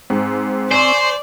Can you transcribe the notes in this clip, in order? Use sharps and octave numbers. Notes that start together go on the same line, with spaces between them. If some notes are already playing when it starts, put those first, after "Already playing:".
G#2 C4
C5 D5 G#5 C6 C#6